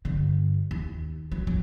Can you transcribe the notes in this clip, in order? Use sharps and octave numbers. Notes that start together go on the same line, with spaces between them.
G2 D3
D#2
F#3
F#3